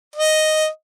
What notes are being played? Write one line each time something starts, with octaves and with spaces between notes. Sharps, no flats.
D#5